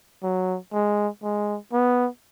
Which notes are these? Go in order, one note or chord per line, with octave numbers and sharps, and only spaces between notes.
F#3
G#3
G#3
B3